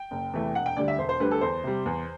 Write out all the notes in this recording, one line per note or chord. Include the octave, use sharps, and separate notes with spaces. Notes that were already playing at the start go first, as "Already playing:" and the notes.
Already playing: G5
F#1
E2 C3 E3 A3
E1 F#5
G5
D2 D3 G3 D5
E5
E1 C5
C5
D2 D3 G3 B4
A4
E2 C5
C3 G3
E2